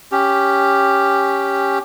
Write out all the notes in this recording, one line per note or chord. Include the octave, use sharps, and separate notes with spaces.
C#4 G4